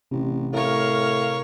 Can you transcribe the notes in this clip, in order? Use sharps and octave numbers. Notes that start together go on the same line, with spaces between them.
A1 C3
A2 A#4 C#5 F5